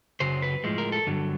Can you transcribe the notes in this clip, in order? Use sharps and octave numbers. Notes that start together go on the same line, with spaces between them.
F#2 C#3 F#3 C5
B4
A2 F3 G#3
A#4
A4
G2 D3 F#3